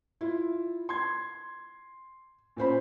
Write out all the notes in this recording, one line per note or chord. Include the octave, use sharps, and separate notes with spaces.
E4 F4
C6 G#6
A#2 C#4 C5 B5